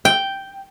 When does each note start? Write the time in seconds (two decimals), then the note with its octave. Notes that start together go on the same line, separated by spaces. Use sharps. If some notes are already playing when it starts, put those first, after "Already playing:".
0.05 G5